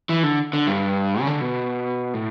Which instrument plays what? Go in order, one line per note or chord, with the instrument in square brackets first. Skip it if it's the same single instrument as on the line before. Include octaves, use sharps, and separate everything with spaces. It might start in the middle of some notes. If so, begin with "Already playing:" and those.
[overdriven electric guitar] E3
D3
D3
G2
C#3
D3
B2
A2